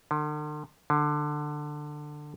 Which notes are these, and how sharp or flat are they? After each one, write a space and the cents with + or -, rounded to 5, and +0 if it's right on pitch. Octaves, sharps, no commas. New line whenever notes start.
D3 +40
D3 +15